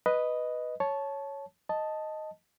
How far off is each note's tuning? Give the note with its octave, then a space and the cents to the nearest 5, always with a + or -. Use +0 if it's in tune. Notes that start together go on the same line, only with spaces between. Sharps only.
B4 +0 D#5 +0
C#5 +0 A5 -15
D#5 +0 A5 +0